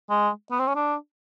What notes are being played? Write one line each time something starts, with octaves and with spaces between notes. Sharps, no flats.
G#3
B3
C4
C#4
D4